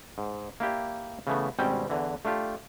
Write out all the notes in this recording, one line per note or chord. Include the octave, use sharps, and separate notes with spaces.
G#2
A#3 E4 G4 D5
C#3 E3 A3 B3
G#1 B2 G3 C4 C#4 G5
E2 D3 E3
A3 D4 F4 G4